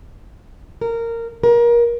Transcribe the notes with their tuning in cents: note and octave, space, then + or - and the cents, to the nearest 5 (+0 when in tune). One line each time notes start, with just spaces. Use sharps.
A#4 -15
A#4 +25